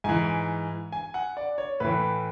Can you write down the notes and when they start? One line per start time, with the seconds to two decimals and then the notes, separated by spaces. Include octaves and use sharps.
0.04 G#2 E3 G#5
0.92 G#5
1.14 F#5
1.37 D5
1.58 C#5
1.80 A2 E3 B4